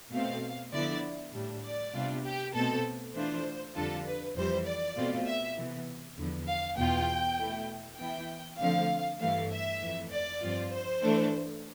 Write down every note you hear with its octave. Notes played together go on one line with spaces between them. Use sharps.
B2 A3 C4 F5
D3 F3 B3 E4 D5
A2 G3 D4
D5
C3 G3 B3 D4 F4
G4
B2 A3 C4 A4
E3 A3 D4 F4 C5
F2 D3 G3 D4 F4 A4
B4
F2 E3 G3 C5
D5
B2 A3 C4 F4
E5
C3 E3 B3
E2 D3 F3 B3
F5
E2 B2 B3 F4 G5
B2 A3 E4
E3 B3 E4 G5
D3 F3 A3 C4 F5
G2 E3 A3 F5
E5
F2 E3 A3
D5
G2 F3 C4 F4
C5
E3 A3 D4